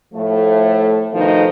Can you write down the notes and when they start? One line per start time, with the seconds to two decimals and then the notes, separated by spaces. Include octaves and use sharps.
0.13 A2 F3 A3
1.12 B2 D#3 F3 A3 D#4